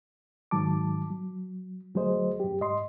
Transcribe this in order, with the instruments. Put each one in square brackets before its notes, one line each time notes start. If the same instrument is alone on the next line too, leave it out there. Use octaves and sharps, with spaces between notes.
[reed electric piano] G#2 D#3 F#3 A5 D6
F#3
D2 F#3 A3 G#4 C5 D#5
F#2 G4
G#2 D#5 C6